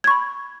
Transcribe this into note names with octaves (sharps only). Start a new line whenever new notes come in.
B5 C#6 G#6